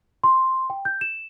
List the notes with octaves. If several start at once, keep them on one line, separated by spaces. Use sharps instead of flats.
C6
G5
G6
E7